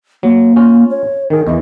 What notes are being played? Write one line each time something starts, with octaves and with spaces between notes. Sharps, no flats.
F#3 A#3
C#4 F4
C#5
D#3 G#4 A#4
E2 E3 D#5